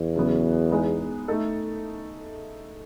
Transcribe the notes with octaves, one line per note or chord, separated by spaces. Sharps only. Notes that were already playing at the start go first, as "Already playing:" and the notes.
Already playing: E2
C#3 F#3 B3
G#3 B3 D#4
A3 D#4 A4